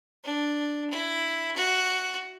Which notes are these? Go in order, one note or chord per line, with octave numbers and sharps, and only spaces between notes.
D4
E4
F#4